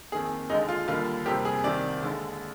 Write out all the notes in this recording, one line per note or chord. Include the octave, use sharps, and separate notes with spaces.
F2 D#3 A#3 G#4
D#2 D3 G#3 D#4
F4
D#2 D3 G3 A#3 F4
F2 C3 G3 A#3 G4
G#4
C2 C3 D#3 D5
D#2 D3 G#3